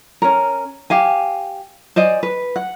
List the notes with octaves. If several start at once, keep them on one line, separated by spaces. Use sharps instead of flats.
C#4 A#4
G4 F5 G#5
C5 D5 D#5 G#5
B4
F#5